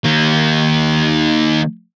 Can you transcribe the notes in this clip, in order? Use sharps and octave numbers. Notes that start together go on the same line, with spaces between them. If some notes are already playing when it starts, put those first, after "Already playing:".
D#3 A#3